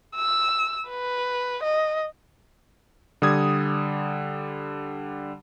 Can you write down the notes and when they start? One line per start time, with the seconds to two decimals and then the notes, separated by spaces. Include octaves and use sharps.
0.16 E6
0.89 B4
1.63 D#5
3.22 D3 G3 D#6 G#6